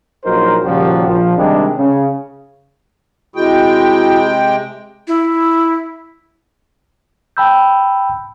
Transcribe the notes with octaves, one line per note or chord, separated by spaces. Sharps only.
A#1 F#3 D#4 A#4 C5
D#2 A#2 C#3 F3 G3 F#4
A#1 F3
C3 D#3 G3 G#3 D4
C#3
C3 G#3 E4 F#4 G#4 G5
E4
G5 A5 B5 E6 G6